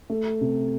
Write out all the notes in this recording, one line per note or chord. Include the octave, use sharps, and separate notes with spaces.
A3
C3